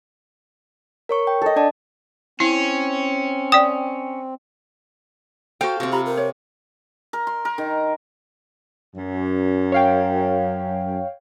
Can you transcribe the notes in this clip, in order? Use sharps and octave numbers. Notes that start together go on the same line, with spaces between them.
A#4 C#5 C#6
G5
A4 D#5
D4 D5 A5
C4 C#4 E4
D5 G5 D#6
F#4 A4 C5 F5 G5
C3 C4 F#4 C5
F4 G4 A#5 B5
A#4
C#5
A#4
C6
A#4
D#3
F#2
C#5 F5 G5